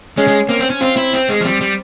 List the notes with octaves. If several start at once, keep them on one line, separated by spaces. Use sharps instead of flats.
G#3 C#4
G#3
A#3 C4
C4
C#4
C4 F4
E4
C4
G#3
F3
G3 C4
G3